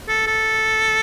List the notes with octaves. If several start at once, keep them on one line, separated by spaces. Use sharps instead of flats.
A4
A4